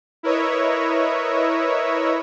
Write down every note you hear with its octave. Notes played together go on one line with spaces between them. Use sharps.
E4 A#4 B4 C#5 D#5 E5